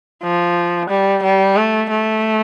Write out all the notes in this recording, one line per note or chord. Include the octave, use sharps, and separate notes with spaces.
F3
G3
G3
A3
A3